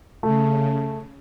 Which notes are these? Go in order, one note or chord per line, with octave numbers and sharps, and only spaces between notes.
C#3 A3